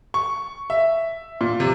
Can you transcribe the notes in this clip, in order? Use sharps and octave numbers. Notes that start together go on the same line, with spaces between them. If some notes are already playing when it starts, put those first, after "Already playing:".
C#6
E5
A#2
C3